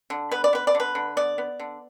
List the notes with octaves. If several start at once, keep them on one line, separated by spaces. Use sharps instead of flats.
D3
B3 B4
D5
B3 B4
D5
D3
B4
D3
B3 D5
B3
D3